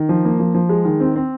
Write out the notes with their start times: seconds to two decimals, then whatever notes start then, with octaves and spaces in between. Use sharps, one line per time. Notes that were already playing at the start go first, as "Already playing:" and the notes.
Already playing: D#3
0.09 F3
0.25 A#3
0.40 F3
0.54 F3
0.69 G#3
0.85 D#3
1.00 C4
1.16 C4